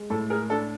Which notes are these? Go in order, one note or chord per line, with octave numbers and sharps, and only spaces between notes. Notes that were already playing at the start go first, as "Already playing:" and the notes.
Already playing: G#3
A2 A4
G#4 A#4
D4 A4